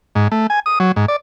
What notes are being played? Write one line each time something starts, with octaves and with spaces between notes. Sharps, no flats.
G#2
A3
G#5
D#6
F#3
G#2
D5